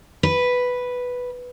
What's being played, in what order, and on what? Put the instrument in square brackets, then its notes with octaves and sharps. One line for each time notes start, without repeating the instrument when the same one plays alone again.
[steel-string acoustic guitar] B4